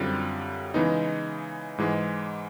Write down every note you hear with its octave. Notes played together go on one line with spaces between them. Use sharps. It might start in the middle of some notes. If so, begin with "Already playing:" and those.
Already playing: F#2 D3 G3 C4 F4
C#3 E3 G#3 B3 D#4
G#2 E3 G#3